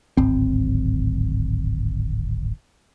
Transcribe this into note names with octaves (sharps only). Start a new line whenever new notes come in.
D1 G#1 C4